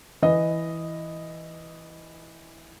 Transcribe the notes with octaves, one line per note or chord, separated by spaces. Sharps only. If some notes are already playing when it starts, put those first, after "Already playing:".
E3 D#5